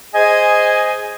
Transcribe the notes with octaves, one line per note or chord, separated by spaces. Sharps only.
G#4 C5 D#5 G#5